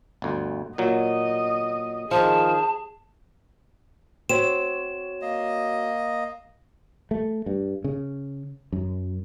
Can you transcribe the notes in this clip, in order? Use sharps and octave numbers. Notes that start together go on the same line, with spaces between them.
G1 D2
A#2 F#3 D#5
D#3 F3 G#4 A5
C4 F#4 C#5 E7
A#3 D#5
A3
G2
C#3
F#2